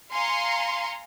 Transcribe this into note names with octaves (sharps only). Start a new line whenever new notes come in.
F5 G#5 A#5 C6 C#7